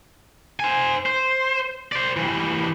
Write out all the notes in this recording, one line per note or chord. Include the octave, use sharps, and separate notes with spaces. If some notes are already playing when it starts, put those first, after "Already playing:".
C5 G#5
C5
C5 D5
E3 G3